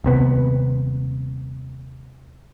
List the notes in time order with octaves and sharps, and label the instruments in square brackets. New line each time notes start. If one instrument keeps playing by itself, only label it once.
[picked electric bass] D#1 C3 B3